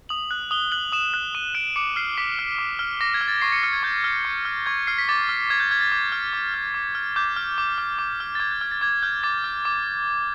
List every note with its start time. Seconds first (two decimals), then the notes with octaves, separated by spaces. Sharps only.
0.09 D#6 F#7
0.31 F#6
0.51 D#6 G7
0.72 F#6 F#7
0.92 D#6 E7
1.14 F#6
1.35 D#6 D#7
1.55 F#6 D7
1.76 D6 C#7
1.96 F6 C7
2.17 D6 B6
2.39 F6
2.58 D6
2.79 F6
3.01 D6 A#6
3.14 G#6
3.21 F6
3.28 A6
3.41 C#6 C7
3.52 C#7
3.58 C7
3.63 F6 C#7
3.73 G#6
3.83 C#6 G6
4.04 F6
4.25 C#6
4.45 F6
4.66 C#6 G#6
4.87 F6 C7
4.98 B6
5.09 D6 A6
5.29 F6
5.50 D6 G#6
5.60 G6
5.71 F6 G#6
5.81 A6
5.92 D6
6.12 F6
6.33 D6
6.54 F6
6.74 D6
6.95 F6
7.16 D6 G6
7.36 F6
7.58 D6
7.78 F6
7.99 D6
8.20 F6
8.35 A6
8.40 D6 G#6
8.51 G6
8.61 F6 G#6
8.71 A6
8.81 D6 G#6
9.03 F6 G6
9.23 D6 A6
9.44 F6
9.65 D6